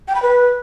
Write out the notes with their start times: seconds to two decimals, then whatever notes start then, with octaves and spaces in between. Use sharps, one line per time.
0.08 G5
0.15 B5
0.22 B4